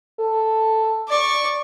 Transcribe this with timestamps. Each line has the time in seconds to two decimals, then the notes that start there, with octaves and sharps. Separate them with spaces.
0.19 A4
1.08 D5 C#6